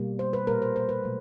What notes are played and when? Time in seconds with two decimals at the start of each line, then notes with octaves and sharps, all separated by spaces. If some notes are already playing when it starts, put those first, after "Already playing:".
Already playing: B2 G3 A#3
0.19 C5
0.33 B4
0.47 A#2 G3 A#3 A#4
0.62 C5
0.76 C5
0.89 B4
1.03 B2 F#3 A3